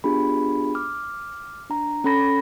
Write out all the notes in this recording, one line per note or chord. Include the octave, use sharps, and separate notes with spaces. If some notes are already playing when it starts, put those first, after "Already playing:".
B3 D4 F4 G4 G#4 B5
D6 F6
D4 A#5
C#4 A4 B5 A#6